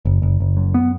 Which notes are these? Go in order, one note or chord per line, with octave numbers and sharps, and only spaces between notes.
F#1
F#1
F#1
F#2
B3